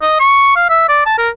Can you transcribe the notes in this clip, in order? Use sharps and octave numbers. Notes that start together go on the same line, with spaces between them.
D#5
C#6
F5
E5
D5
A5
A#4